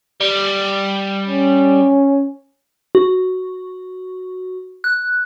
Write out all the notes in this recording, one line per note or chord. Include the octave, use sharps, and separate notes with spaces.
G3
C#4
F#4
F#6